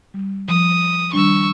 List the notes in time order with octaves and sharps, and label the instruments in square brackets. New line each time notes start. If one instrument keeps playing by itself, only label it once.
[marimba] G3
[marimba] F3 [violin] D#6
[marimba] D#3 G3 D4 [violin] C#6 E6